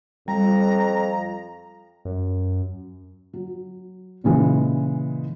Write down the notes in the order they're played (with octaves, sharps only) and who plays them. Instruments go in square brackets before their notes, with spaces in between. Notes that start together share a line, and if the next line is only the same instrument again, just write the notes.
[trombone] F2 [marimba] G3 [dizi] A#5
[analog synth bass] F#2
[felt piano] F#3
A#2 C#3 E3 G#3